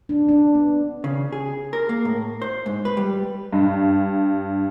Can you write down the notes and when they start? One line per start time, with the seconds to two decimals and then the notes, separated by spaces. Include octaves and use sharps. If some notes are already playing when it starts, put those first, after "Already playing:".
0.09 D4
0.29 D4
0.55 B3
1.04 C#3
1.32 G#4
1.73 A#4
1.89 A#3
2.05 A2
2.42 C5
2.66 G#2
2.85 B4
2.97 G3
3.53 G2